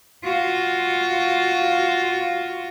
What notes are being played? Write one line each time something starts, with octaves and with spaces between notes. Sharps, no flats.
F4 F#4